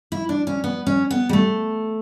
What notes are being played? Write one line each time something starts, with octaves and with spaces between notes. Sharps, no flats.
E4
D4
C#4
B3
C#4
B3
G3
A3